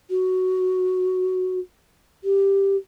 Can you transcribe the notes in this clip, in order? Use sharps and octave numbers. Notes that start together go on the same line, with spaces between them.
F#4
G4